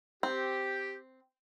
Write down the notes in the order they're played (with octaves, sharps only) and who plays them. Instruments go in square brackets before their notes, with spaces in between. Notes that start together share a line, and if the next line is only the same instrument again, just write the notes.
[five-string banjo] C4 [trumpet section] G4